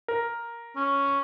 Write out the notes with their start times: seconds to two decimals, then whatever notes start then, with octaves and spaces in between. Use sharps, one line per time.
0.08 A#4
0.76 C#4